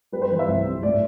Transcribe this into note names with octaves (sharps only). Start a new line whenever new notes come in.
G3 B4
C5
E3 B4
E5
C2
C3
A2 D5